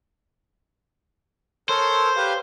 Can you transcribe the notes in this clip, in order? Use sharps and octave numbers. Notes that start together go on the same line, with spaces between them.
A4 A#4 C5 C#5
G4 B4 F5